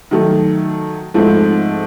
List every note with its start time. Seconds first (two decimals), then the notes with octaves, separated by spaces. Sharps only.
0.11 D#3 F#3 A3
1.14 G#2 F3 A3 C4